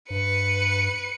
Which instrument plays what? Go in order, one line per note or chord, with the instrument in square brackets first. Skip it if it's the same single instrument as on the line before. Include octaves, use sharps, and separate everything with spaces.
[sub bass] G2 [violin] B4 C#7